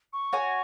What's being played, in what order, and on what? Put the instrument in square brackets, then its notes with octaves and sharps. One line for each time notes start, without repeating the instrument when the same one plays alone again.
[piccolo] C#6
[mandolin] F#4 C#5 G#5